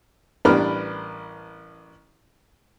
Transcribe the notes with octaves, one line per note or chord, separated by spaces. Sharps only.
A1 G3 D4 A#4 B4 F6